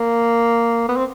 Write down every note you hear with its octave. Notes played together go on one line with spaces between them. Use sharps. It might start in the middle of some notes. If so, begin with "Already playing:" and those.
Already playing: A#3
B3
C4